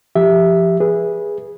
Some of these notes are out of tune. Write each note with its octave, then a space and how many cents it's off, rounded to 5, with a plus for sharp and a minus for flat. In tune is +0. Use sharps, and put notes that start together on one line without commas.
F3 -20 G4 +0 E5 +0
G#4 -15 B4 -20